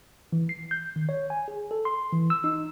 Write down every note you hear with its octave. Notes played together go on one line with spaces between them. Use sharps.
E3
C7
G6
D#3
C#5
G#5
G#4
A4
C6
E3
E6
D#4